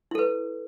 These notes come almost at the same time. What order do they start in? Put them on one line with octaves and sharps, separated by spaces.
E4 A4 B4